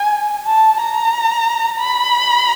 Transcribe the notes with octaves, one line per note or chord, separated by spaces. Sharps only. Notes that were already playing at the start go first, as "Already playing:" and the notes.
Already playing: G#5
A5
A#5
B5